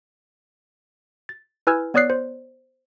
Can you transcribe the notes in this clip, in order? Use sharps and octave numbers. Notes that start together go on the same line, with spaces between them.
A6
E4 B4 G#5 E6 F6 G#6
B3 C#5 D5 D#6 F#6 C7
C5